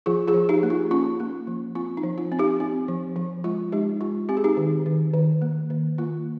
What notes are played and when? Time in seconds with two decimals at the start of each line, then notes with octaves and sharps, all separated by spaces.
0.06 F3 F4 G#4
0.28 F4 G#4
0.34 F3
0.49 D#4 G4
0.63 A#3
0.70 F4
0.91 C#4 F4
1.20 A#3
1.47 F3
1.75 C4 F4
1.97 D#4
2.03 F3
2.18 F4
2.32 C4
2.39 D#4 G4
2.60 C4
2.88 F3
3.16 F3
3.44 G#3 F4
3.72 G#3 D#4 G4
4.01 G#3 F4
4.29 C4 G4
4.37 G#4
4.44 D#4 G4
4.57 D#3
4.86 D#3
5.14 D#3
5.42 A#3
5.70 D#3
5.98 A#3 F4